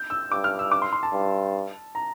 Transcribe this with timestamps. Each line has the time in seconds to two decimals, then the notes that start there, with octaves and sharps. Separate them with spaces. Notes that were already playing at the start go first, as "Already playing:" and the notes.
Already playing: G6
0.10 E6
0.31 G2 D6
0.44 F6
0.59 E6
0.72 D6
0.82 C6
0.93 C6
1.03 A5
1.13 G2
1.95 A#5